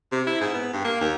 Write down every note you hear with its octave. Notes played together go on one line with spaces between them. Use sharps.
C3
E4
G#2
B3
G2
A#3
D#2